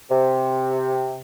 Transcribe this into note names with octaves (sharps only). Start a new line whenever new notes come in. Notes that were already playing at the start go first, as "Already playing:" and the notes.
C3